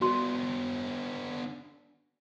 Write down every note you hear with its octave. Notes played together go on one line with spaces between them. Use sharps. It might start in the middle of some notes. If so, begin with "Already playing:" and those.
B3 D4 F#4 C6